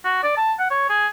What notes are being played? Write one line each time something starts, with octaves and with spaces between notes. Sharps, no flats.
F#4
D5
A5
F#5
C#5
G#4